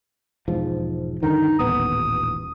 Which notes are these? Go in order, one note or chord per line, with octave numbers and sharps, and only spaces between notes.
E1 G#2 F3
G2 D3 D#3 D#4
D#1 A1 B3 D#6